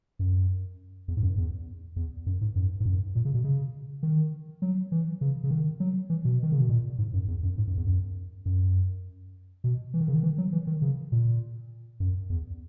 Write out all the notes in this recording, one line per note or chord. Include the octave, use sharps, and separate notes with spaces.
F#2
E2
G#2
F#2
E2
E2
F#2
G#2
F#2
G#2
F#2
A#2
C#3
B2
C#3
D#3
F#3
E3
C#3
C#3
D#3
F#3
E3
B2
D#3
C#3
B2
A#2
G#2
F#2
E2
F#2
G#2
F#2
E2
F#2
F#2
B2
E3
D#3
C#3
D#3
E3
F#3
E3
D#3
C#3
A#2
F#2
E2